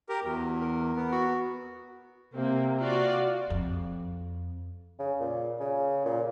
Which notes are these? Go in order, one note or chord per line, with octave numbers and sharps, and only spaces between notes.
G4 A#4
E2 F#3
A#4
B3
F#4
C3 A#3 C4
F4 F#4 D5
F2
C#3
A#2
C#3
A#2